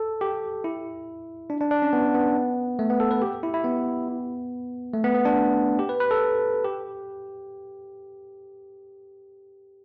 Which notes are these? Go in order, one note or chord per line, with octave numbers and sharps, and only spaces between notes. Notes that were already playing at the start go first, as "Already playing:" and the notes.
Already playing: A4
G4
E4
D4
D4
D4
C#4
B3
B3
A3
B3
A4
B4
G4
E4
E4
B3
A3
B3
B3
D4
G4
B4
B4
A4
G4